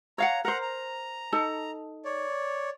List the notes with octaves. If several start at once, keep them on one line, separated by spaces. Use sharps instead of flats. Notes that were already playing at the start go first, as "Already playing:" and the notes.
C#5 F5 F#5 A#5
A#4 C5 F#5 A#5
A#5
D#4 A4 A5
C#5 D5